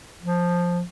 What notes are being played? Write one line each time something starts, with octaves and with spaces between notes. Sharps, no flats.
F3